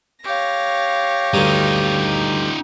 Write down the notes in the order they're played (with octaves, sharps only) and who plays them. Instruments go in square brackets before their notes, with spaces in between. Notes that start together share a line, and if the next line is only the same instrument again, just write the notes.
[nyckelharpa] G4 [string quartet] C#5 F5 A#6
[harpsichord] D2 G2 [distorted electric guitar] D#4 F4